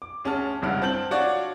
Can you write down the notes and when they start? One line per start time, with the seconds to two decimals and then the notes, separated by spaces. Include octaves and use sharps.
0.02 D6
0.24 D2 C#4 G#4 A5 F6
0.62 F1 C#2 G2 E4 F#5 F6
0.82 C4 A5 G6 F#7
1.11 D4 F4 F#4 C#5 D5